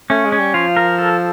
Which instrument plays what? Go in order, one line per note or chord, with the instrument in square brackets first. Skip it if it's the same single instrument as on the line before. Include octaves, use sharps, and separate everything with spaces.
[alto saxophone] A3 [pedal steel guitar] C#4
[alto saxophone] G#3
[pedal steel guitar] C#4
[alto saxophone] G3
[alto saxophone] F3 [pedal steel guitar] F4
[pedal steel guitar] A#4
A4